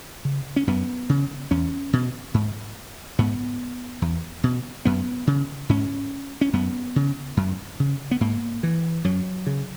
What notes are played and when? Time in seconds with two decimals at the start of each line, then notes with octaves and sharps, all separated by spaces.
0.25 C#3
0.56 C#4
0.67 F#2 B3
1.09 C#3
1.51 E2 C#4
1.93 B2
2.34 G#2
3.19 G#2 B3
4.02 E2
4.44 B2
4.85 F#2 B3
5.27 C#3
5.69 G#2 C#4
6.41 C#4
6.53 F#2 B3
6.96 C#3
7.37 F#2
7.80 C#3
8.11 B3
8.21 G#2 A#3
8.63 E3
9.04 F#2 F#3
9.47 C#3